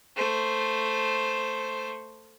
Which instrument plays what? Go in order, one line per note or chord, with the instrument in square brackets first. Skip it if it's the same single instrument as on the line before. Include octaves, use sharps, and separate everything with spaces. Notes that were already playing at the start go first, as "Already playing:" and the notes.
[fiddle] A3 C5